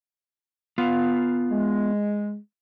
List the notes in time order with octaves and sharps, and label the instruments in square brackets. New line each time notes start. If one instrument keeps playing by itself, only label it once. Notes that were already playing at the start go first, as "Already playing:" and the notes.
[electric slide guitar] B3 F4 F5
[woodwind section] G#3